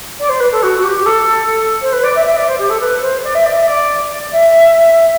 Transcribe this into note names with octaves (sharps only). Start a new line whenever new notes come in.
D5
C5
B4
A4
F#4
F#4
G4
G4
A4
C5
B4
D5
E5
E5
D5
C5
G4
A4
B4
C5
D5
E5
D5
E5
D5
D5
E5